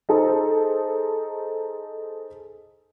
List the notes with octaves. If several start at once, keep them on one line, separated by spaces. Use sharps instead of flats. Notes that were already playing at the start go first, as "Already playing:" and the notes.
D#4 G#4 A4 C5